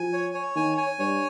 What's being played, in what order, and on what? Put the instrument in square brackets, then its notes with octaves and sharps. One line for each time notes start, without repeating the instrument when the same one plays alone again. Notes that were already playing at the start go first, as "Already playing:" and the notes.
Already playing: [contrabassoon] F3 [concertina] G#5
[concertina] C#5
C#5
[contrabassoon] D#3 [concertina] G#5
[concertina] G#5
[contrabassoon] G2 [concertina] C#5